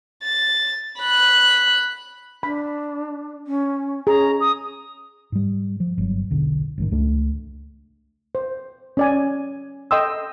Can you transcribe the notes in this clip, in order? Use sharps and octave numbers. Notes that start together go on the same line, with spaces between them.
A6
B5 F#6
D4 B5
C#4
C#4 G#4 A#5
D#6
G#2 G3
F3
G1 F#3
E1 B1 D3
A1 G#2 D#3
C#2 A3 D4
C5
C#4 D5 G#5
A4 D#5 G5 C6 D#6 E6